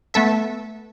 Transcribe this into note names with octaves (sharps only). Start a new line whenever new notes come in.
A3 B3 A4 E5